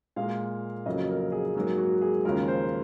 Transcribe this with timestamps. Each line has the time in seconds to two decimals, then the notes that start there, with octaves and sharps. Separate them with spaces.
0.16 A#2 G#3 F5
0.86 F2 C#3 F#3 A#3 D#5
1.09 A#4
1.32 G#4
1.55 G#2 F#3 A#3 G#4
1.78 F#4
2.01 G#4
2.25 D#2 C#3 F3 G#3 A#4
2.48 C5